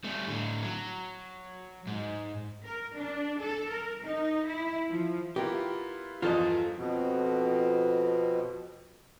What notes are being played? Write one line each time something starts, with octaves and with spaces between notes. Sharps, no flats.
G3 A3
A2 D3
F#3
G#2
A#4
D4
A4
A#4
D#4
E4
F3
B3 E4 F4 G4 A#4
E2 G2 F3 F4 A4 D#5
F2 B2